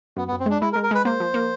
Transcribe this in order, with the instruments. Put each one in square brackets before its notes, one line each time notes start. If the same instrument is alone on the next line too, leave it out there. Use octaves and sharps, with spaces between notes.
[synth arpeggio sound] F#2 [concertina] B3
[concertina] B3
[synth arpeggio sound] F#2
[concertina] C4
[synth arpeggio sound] G#3 [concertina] D4
[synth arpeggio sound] G#3 [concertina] E4
[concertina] A#4
[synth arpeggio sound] G#3
[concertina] A#4
[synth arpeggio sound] G#3 [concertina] B4
[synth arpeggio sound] A#3 [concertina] C5
[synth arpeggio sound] F3
A#3